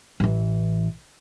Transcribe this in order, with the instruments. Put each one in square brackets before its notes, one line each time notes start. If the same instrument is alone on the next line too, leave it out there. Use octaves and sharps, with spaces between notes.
[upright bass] A1 E3